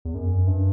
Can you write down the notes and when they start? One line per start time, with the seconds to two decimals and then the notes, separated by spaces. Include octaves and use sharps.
0.05 E2
0.15 F#2
0.47 G2